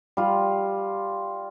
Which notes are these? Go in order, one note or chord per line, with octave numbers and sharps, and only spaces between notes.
G3 F4